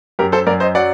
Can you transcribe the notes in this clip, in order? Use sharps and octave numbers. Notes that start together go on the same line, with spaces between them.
F#2 G4 A#4
A4 C5
F#2 A#4 D5
C5 D#5
F#3 D5 F#5